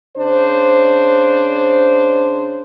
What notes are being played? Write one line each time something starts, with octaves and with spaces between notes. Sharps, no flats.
C#3 D4 C5